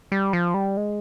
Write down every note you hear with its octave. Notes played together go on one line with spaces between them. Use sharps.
G3
F3
G3
G#3